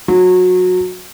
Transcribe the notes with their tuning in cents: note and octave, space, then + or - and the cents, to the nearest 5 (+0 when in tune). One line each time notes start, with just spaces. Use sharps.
F#3 -25